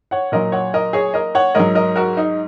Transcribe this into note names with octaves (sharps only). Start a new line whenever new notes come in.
C#5 F#5
A#2 F#3 A#4 D#5
C#5 F#5
A#4 D#5
G#4 C#5
A#4 D#5
C#5 F#5
G#2 F#3 A#4 D#5
A#4 D#5
F#4 A#4
D#4